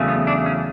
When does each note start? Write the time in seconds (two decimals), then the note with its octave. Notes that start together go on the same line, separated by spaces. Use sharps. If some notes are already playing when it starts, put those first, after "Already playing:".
Already playing: E2 C#3 F#3 A3
0.08 B3
0.27 D4
0.46 C#4